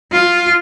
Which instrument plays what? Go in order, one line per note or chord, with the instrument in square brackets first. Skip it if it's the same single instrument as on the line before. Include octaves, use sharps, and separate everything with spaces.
[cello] F4